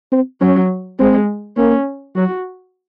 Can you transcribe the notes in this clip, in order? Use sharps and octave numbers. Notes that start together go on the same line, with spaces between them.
C4
F#3 C#4
G#3 C4
A#3 C#4
F#3 F#4